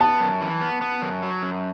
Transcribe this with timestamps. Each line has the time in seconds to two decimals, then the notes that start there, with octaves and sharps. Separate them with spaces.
0.01 B3 A5
0.21 F#2
0.41 E3
0.61 B3
0.81 B3
1.02 F#2
1.23 F#3
1.43 F#2